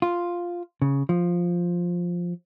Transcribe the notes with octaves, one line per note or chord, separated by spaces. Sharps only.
F4
C#3
F3